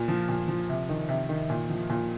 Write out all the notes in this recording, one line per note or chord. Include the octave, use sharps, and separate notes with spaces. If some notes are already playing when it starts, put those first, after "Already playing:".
Already playing: A#2
F3
A#2
F3
C3
D#3
C3
D#3
A#2
F3
A#2